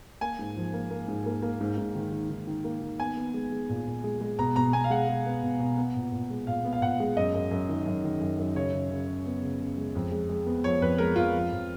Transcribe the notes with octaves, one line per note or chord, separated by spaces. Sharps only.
A#3 G#5
G#2
F3
A#3
A#3
G#2
A#3
A#3
G#2
G#2
D#3
D#3
D#3
D#3
A#3
D#3
B3 G#5
B3
G#3
G#3
A#2
A#2
G#3
G#3
B2 A#5
B2 A#5
B2 G#5
F5
G#3 F#5
G#3
B3
B2
B2
B3
A#2
A#2
G#3
A#2 F5
B3
F5
A#2 F#5
G#3
F#2 D#5
F#2
F#2
D#3
F#2
D#3
F#2
F#2
C#3 C#5
C#3
C#3
C#3
B3
C#3
C#3
G#3
F2
G#3
G#3
B3
F3 C#5
F2 B4
G#3 A#4
F2 F4
F3
F2